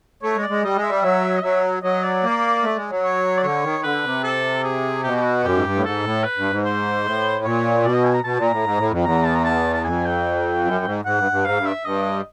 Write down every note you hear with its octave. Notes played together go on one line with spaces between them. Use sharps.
A3 C#5
G#3
D5
G#3
G3 D#5
G#3
E5
G3
F#3 E5
D#5
F#3 E5
F#3 D#5
D5
A#3
A3
G#3
F#3
C#5
D5
D3 C#5
D#3
D3 B4
C3
A4
G#4
B2 G4
G4
F#4
F#2 G4
G#2
G2
A2
G#2 A4
A2
B4
G2
G#2
C5
A2
A#2 C#5
B2 D5
D#5
G#5
A#5
B2 A5
A#2
A#5
A2
G#2
A2
F2
E2 A#5
A5
A#5
A5
A5
F2 G#5
G5
F#2
G#2
G#2 F#5
G2
G2
G#2 F5
G2
E5
G2 D#5